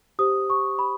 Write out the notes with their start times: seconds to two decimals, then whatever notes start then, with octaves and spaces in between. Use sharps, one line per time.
0.19 G4 C5 D#6
0.50 C#6
0.79 B5